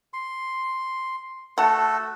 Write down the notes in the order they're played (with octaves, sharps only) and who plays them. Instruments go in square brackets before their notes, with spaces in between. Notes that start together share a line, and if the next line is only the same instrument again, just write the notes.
[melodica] C6
[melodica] A3 F#4 A4 [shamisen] F#5 A5